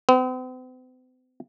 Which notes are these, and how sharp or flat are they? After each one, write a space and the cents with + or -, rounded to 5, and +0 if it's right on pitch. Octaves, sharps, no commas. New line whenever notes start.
C4 -45